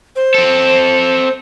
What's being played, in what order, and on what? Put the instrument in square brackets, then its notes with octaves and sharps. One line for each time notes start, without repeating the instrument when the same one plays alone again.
[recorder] C5
[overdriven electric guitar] C4 A4